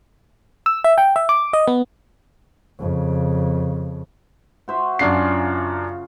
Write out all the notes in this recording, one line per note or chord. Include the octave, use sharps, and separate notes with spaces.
E6
E5
G5
E5
D6
D#5
B3
F2 C#3
F#4 C5 E5
F#2 C#3 D4 F4 G#4 C7